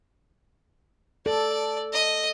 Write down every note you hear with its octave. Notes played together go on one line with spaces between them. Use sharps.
A4 D5
D#5